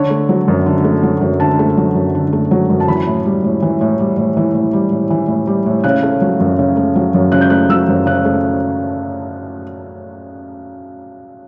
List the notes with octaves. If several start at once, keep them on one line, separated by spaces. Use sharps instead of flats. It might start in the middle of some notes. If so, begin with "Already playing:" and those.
Already playing: D3 C#5
A3
F#3
F#2
D3
A3
F#3
F#2
D3 A5
A3
F#3
F#2
D3
A3
F#3
F#2
A5
E3 B5
A2
G3
A2
E3
A2
G3
A2
E3
A2
G3
A2
E3
A2
G3
A2
C#3 F#6
A3
F#3
F#2
C#3
A3
F#3
F#2
C#3 F#6
G6
A3 F#6
F#3 E6
F#2
C#3 F#6
A3